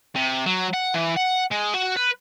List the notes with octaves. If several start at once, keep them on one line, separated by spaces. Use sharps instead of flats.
C3
F#3
F#5
E3
F#5
G#3
F#4
B4